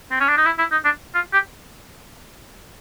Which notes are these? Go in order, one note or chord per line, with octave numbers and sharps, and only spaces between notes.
C4
C#4
D4
D#4
E4
E4
D#4
D4
F4
G4